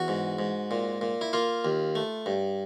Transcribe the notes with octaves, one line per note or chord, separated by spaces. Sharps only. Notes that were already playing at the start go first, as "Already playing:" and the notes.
Already playing: E2 F#4
G#2
G#2
A#2
A#2
E4
A#3 F4
D#2
A3
G2